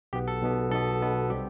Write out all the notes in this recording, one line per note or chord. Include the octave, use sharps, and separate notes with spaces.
B1 B2 B3 G4
A4
B1 B2 B3
B1 B2 B3 A4
B1 B2 B3
C3 G3 C4 G4